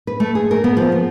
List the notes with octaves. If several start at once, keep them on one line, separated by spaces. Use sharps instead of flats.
B4
A3
G#4
A#4
B3
F3
B3